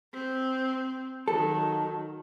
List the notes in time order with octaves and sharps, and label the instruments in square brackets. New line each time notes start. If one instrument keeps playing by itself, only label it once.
[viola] C4
[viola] D#3 F#3 [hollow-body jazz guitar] A4